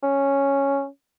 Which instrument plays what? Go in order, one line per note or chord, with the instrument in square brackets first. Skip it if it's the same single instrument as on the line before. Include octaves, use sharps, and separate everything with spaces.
[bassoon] C#4